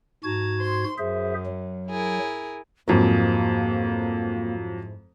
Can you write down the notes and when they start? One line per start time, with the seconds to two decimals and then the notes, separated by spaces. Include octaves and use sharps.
0.24 G#2 F#4 A5 A#5 G#6
0.58 C5 C6
0.98 F#2 G#4 C5 E5
1.47 F#3
1.88 E4 G#4 A#4
2.88 F2 G#2 F#3 A#3 E4